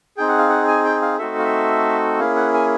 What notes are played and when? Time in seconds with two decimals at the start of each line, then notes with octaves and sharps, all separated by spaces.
0.17 C4 D#4 G#4 G5
0.28 F#5
0.38 F5
0.49 F#5
0.68 G#5
0.85 G5
1.02 F5
1.19 A3 C4 D#4 F#4 A4 E5
1.39 F5
1.44 E5
2.19 A#3 C#4 E4 G#4 F5
2.36 F#5
2.54 G#5